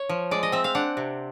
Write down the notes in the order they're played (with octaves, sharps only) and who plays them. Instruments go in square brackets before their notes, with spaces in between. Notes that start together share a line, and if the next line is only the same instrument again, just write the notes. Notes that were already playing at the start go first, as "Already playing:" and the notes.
Already playing: [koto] C#5
F3
G#3 D5
D#5
C4 E5
F5
D4 F#5
C3